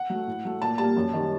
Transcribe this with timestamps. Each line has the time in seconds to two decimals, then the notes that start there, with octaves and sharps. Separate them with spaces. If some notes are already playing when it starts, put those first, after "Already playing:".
Already playing: F#5
0.10 F#3 A3
0.27 A2
0.45 F#3 A3
0.62 A#2 A5
0.78 G3 A#3 A5
0.97 F#2
1.13 D#3 G3